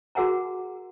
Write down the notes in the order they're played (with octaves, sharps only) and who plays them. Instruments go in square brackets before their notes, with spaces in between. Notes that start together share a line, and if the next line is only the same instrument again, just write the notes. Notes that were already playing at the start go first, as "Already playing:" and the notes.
[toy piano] F#4 G#4 A#4 F#5 G#5 A#5